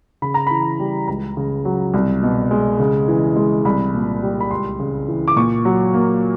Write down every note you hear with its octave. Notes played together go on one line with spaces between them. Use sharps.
C#3 B5
A#5
E3 B5
G3
C#2 A#5
C#3
F#3
C2
B2
G#3
C#3
E3
G#3
C2 B5
A#2
G3
B5
C#2 C6
C#3
E3
D6
A#2 C#6
F#3
A#3